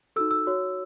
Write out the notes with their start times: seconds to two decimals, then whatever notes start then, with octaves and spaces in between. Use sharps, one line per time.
0.16 D#4 F#4 A4 E6
0.31 E6
0.47 F#4 C#5